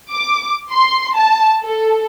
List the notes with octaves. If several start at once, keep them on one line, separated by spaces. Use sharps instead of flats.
D6
C6
A5
A4